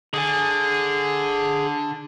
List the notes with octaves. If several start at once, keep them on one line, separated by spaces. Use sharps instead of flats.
D3 G#4 G#5